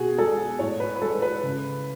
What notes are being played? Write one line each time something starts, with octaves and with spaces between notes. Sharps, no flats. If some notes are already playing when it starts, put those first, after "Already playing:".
Already playing: B2 F#4 G#4
G#3 A4
A2 C#5
B4
B4
G#3 A4
B4
C#3